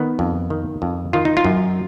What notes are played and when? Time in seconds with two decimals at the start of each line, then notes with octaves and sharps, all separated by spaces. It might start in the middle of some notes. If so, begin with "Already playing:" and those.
Already playing: D#3 B3
0.19 F2
0.50 D#3
0.82 F2
1.13 D#3 F4
1.25 D#4
1.37 F4
1.44 F#2